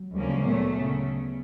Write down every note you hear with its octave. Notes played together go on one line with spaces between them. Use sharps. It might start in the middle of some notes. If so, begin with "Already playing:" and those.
Already playing: F#3
D2 C#3 F3 G3 A#3 C#4
G#3
A#2 F#3 A3 B3
C#3